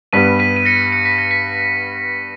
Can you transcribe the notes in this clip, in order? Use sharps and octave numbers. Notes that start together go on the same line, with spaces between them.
G2 G3 B3 B6 D#7
B6 D#7
D#7
A#6 C#7
C#7
B6
A#6
B6